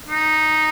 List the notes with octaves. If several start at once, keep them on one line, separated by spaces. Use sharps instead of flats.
D#4